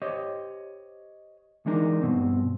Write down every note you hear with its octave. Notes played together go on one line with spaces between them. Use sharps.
G4 C5 C#5 D#5
E3 G#3 D4 D#4 A#4
G2 B2 C4